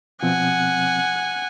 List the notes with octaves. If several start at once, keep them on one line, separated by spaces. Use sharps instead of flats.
B2 F3 C4 F#5 G#5